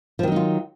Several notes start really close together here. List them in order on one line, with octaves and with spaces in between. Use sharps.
F3 D#3 F#3 D#4 F4